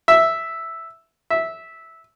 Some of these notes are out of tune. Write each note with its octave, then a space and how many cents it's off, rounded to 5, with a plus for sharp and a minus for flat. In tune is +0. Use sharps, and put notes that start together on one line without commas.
E5 +0
E5 -10